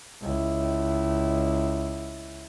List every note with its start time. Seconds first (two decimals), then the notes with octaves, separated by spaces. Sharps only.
0.22 C#2 E4